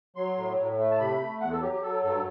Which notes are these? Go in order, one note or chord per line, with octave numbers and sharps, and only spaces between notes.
F#3 C6
A2
A2
A3
A5
C3 B5
A3
E2 F#5
A4
F#3 G4
G4
F#3 A4
G2 A4